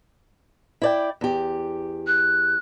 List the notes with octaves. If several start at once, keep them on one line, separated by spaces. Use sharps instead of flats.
E4 D5 G5
E2 G4
F#6